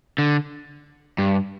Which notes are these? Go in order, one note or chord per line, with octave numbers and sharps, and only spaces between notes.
D3
G2